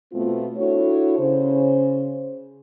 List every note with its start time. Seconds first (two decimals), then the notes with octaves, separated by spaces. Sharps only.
0.13 B2 A3 B3 C4 F4
0.56 D4 E4 F#4 A4 C#5
1.18 C#3 C5